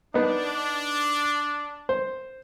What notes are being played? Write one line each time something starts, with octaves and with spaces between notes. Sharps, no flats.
B3 D4 D#4
C5